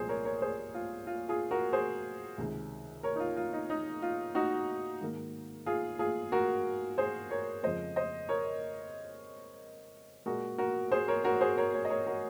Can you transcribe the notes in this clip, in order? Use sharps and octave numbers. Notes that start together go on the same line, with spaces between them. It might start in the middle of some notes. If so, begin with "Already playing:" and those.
Already playing: C2 A#2 F3 G#3 G#4 C5
A#4 C#5
A#4 C#5
G#4 C5
F4
F4
F4 G#4
F#4 A#4
G#4 C5
C#2 C3 D#3 G#3
A#4 C#5
D#4
F4
F4
D#4
D#4
F4
D#4 F#4
G#2 D#3 A#3
F4 G#4
F4 G#4
F#4 A#4
G#4 C5
A#4 C#5
F2 C#3 F3 G#3 C5 D#5
C5 D#5
A#4 C#5
A#2 G#3 F#4 A#4
F#4 A#4
G#4 C5
A#4 C#5
F#4 A#4
G#4 C5
A#4 C#5
A#4 C#5
D#5
A#4 C#5
F#4 A#4